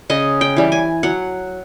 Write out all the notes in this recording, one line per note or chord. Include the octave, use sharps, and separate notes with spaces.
C#3 D#5
G5
E3 G3
G#5
F#3 F#5